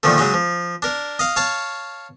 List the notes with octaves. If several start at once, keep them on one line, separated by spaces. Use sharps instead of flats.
A#2 D3 D#3 F3 A3
C#3 F#3 G#3 D#4
F3
D4 A#4
D#5 F5
C#5 F5 A5 C#6